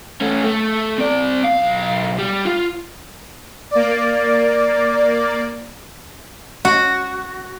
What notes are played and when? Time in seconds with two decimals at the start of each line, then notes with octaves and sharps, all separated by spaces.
0.21 A3 C#4
0.45 A3
0.99 C4 D5
1.45 B1 F5
2.18 G3
2.46 F4
3.71 A#3 D5
6.65 F#4